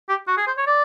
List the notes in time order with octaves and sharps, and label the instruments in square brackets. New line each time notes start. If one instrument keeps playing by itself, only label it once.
[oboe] G4
F#4
G#4
C5
C#5
D5